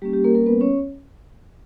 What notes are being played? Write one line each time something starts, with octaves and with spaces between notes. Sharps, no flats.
G3 A#3 C#4 G4
G4
A#3 A#4
A#3 A#4
B3 B4
C#4 C#5